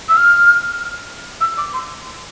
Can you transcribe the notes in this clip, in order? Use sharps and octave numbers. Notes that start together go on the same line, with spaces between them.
E6
F6
E6
D6
C6